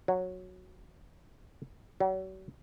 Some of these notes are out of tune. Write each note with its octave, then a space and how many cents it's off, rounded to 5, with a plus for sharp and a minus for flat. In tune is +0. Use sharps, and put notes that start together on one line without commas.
F#3 -10
F#3 +40